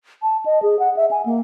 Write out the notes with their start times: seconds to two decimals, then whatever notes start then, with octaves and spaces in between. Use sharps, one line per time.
0.23 A5
0.46 D#5
0.63 G#4
0.79 F#5
0.96 E5
1.11 G#5
1.25 A#3